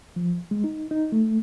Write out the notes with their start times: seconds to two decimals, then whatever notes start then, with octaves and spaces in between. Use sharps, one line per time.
0.16 F3
0.51 G#3
0.64 D#4
0.91 D#4
1.12 A3